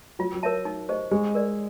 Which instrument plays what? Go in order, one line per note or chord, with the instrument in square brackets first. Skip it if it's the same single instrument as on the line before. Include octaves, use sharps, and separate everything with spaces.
[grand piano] F#3 [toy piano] F4
[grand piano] F#3
[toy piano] A#4 C#5 E5 A5
D#4
G4 C5 D#5
[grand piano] G#3 [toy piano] G4
[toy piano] A#4 D5